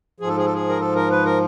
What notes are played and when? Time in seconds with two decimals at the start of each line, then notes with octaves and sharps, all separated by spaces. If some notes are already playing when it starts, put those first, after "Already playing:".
0.20 G#2 F3 G#4
0.28 A4
0.37 G#4
0.45 A4
0.54 G#4
0.69 A#4
0.80 A4
0.95 A#4
1.11 B4
1.25 A#4